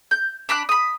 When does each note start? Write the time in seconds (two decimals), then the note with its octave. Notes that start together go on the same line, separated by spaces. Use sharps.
0.11 G6
0.49 D4 B5 D6 F#6
0.69 B5 D#6